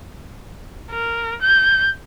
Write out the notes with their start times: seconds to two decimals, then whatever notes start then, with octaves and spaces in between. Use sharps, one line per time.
0.91 A#4
1.42 G6